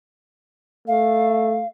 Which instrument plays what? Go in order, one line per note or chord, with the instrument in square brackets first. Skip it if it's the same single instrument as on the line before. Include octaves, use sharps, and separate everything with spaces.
[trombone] A3 [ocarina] F5